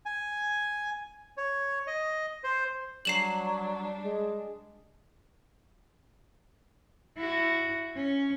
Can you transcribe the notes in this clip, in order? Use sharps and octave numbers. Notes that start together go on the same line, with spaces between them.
G#5
C#5
D#5
C5
F#3 G3 D4 C7 E7 F#7
G#3
E4 F#4
C#4